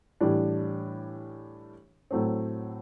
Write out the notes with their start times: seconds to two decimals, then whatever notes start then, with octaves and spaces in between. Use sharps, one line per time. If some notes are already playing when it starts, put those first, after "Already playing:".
0.21 A2 E3 G3 D4
2.11 A2 F#3 A3 C4